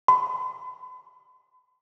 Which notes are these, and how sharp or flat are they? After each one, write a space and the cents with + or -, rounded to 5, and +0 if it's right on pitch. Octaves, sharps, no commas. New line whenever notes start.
B5 +45